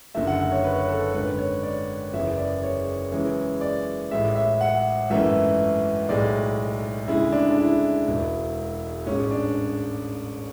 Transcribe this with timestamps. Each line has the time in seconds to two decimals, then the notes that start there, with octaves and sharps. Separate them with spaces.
0.15 F#1 F#2 D3 A3 E5
0.27 F#5
0.39 E5
0.52 C#5
0.64 B4
0.73 C#5
0.81 B4
0.89 A4
1.14 G#1 F#2 D3 B4
1.38 C#5
1.63 D5
2.13 F#1 E2 C#3 E3 E5
2.37 D5
2.63 C#5
3.12 F#2 C#3 E3 G#3
3.61 D5
4.11 A1 A2 G#3 E5
4.36 E5
4.61 F#5
5.10 G#1 F#2 E3 A3 E5
6.09 B1 A2 G#3 D5
7.08 D2 C#3 G#3 E4
7.32 D4
7.51 D4
7.58 E4
8.07 E1 E2 B2
9.06 A1 G#2 G#3 C#4
9.31 D4